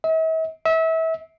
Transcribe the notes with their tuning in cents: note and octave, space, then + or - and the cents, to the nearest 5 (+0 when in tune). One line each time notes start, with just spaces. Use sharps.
E5 -45
E5 -30